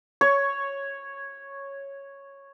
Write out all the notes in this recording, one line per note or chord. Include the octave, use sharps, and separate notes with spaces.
C#5 C#6